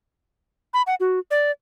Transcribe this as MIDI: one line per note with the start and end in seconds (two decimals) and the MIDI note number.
0.74 0.82 83
0.87 0.95 78
1.00 1.19 66
1.31 1.51 74